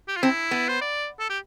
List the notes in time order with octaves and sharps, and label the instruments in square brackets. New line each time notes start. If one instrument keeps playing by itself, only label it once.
[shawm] G4
F4
[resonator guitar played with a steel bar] C4 [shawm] E4
[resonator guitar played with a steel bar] B3
[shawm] C5
D5
A4
G4